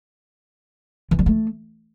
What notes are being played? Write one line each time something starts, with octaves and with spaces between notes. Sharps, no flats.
E3
G3
A3